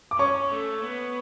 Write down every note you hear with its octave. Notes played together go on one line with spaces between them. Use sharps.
D6
C#4 C#5 C#6
A3
B3